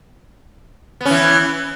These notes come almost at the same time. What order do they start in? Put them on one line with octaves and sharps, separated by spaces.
B3 C#4 E3